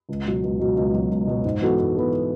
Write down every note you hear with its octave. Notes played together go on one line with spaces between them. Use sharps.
C#2
B2 F#3
C#2
B2 F#3
C#2
B2 F#3
C#2
B2 F#3
G#2
E3 B3 F#4 A4
G#2
E3 B3 F#4 A4